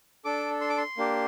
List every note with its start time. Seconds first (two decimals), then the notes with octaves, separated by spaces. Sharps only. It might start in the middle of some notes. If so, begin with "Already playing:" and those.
0.25 D4 A4 D6
0.61 C6
0.70 D6
0.77 C6
0.97 A#3 D4 G4